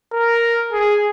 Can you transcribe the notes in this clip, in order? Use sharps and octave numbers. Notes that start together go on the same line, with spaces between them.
A#4
G#4